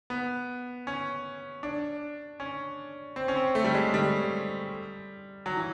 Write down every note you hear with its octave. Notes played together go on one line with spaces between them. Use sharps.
B3
C#4
D4
C#4
C4
C#4
C4
A3
G3
G#3
G3
F#3
E3